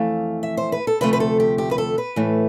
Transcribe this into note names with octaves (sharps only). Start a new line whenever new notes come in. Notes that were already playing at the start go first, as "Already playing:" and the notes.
Already playing: F2 E3 A3 F5
E5
C5
B4
A4
D2 C3 F3 A3 B4
B4
A4
G4
G4
B4
A4
B4
A2 E3 A3